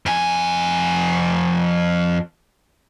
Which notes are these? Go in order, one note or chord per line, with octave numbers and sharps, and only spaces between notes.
F2 G#5